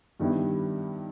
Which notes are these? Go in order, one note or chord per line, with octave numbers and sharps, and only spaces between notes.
G2 D#3 G3 B3 E4